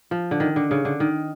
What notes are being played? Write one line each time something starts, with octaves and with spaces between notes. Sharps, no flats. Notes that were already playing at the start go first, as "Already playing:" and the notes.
F3
D3
D#3
D3
C#3
D3
D#3